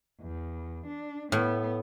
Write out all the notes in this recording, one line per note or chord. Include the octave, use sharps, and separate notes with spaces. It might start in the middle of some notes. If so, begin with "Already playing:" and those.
E2
D4
A2 B3